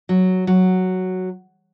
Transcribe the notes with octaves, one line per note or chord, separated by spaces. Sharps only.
F#3
F#3